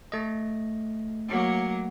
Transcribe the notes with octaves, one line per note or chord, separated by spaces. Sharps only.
A3 D#5
F#3 A#3